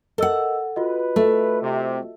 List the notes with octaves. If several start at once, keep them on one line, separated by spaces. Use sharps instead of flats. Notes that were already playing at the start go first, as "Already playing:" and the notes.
A4 A#4 D#5 F#5 E6
F4 F#4 B4 D#5
A3 A4
C3